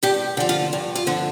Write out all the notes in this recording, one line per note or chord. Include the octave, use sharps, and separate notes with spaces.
G2 G4
D3 F3
F4
G2
F4
D3 F3